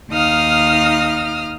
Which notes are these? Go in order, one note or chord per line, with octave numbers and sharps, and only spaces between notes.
D#2 D#4 F5 D#6 F6